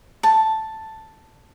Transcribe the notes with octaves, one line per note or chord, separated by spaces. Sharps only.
A5